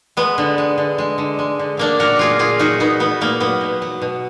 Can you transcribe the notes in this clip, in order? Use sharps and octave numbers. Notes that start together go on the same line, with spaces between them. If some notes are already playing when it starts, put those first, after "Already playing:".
G#3 B3
D3
G#3
D3
G#3
D3
G#3
D3
F#3 A#3 D4
A#2 F#4 A#4
F#3 F4 G#4
A#2 F4 G#4
F#3 D#4 F#4
A#2 B3 D#4
F#3 B3
A#2 A#3
F#3 B3
B2
F#3
B2